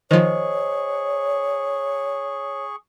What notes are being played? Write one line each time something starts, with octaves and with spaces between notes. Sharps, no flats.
D#3 F3 G#4 C5 C#5 D#5 C#6